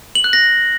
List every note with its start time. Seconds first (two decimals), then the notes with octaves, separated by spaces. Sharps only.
0.15 F#7
0.24 F#6
0.33 A#6